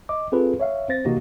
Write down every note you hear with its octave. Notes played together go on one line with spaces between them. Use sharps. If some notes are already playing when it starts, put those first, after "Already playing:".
D#5 D6
C4 F4 G#4 A4 B4
C#5 E5 F5
C4 C5 A6 A#6
C3 E3 A#3 D#4 F#4 G4